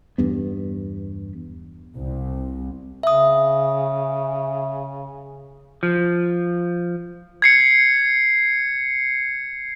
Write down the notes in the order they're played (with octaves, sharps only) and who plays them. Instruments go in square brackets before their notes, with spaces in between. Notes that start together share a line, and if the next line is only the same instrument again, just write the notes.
[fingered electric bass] E2 G2 B3
[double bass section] C2
[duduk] C#3 [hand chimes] E5 D#6
[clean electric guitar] F3
[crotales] G#6 C7 C#7